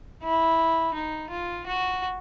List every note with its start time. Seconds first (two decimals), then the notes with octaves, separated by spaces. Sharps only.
0.23 E4
0.94 D#4
1.30 F4
1.66 F#4